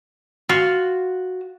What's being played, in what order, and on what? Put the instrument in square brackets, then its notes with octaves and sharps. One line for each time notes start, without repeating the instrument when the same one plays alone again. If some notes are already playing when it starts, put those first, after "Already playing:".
[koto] F4 [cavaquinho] F#4